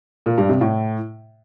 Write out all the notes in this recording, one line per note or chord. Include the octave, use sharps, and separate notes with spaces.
A#2
G2
C3
A2